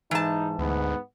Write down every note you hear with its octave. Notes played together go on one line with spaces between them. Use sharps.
G#2 E3 D#4 A5
D2 G#2 B3